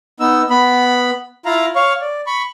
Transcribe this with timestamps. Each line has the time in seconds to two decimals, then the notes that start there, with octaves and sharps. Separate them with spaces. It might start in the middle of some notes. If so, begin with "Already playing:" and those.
0.20 B3 D#4 E6
0.50 B3 B5
1.45 E4 F4 F5 A#5
1.75 C#5 F5 C#6
2.01 D5
2.26 B5 C#6